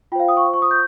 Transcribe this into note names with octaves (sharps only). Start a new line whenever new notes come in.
F4 C5 F5 G5
D#6
C#6
F4 C5
C#6
D#6
G6